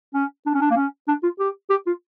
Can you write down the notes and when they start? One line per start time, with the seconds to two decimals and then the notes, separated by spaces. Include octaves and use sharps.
0.14 C#4
0.46 D4
0.55 C#4
0.61 D4
0.71 A#3
0.76 C#4
1.08 D4
1.23 F4
1.40 G4
1.70 G4
1.87 F4